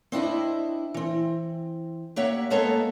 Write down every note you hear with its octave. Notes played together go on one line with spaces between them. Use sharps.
C4 D4 E4 D#5
E3 C4
A#3 G4 C#5 E5 F#5
G#3 A#3 B3 A4 C#5 D#5